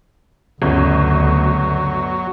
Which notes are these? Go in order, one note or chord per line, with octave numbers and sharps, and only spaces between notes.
G1 D2 C#3 F#3